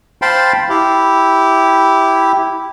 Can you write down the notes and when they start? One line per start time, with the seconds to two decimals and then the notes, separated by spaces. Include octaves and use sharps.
0.22 C5 F5 G5 A5 B5 C6
0.69 E4 G4